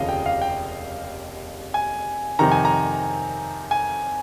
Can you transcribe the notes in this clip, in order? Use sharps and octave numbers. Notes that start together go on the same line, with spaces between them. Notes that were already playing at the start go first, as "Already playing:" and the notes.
Already playing: F1 D#2 C#3 F3 D#5 F5
G5
F5
G5
G#5
F2 C3 D#3 A#5
G#5
A#5
G#5